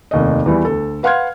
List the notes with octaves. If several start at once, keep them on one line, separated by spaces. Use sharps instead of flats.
F1 D#2 D#5
E2 E3 G3 E4
D2 A4
B4 F5 F#5 C6 F6 G#6